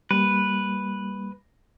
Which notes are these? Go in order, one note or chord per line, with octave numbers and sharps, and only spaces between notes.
G3 A#3 B4